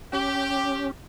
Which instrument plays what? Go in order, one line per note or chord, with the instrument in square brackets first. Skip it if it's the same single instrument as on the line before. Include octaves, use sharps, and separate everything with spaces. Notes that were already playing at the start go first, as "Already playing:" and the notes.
[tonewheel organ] C#4 [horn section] G4